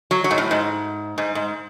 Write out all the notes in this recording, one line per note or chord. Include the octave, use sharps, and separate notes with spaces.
F#3
F#3
G#2
A2
G#2
G#2
G#2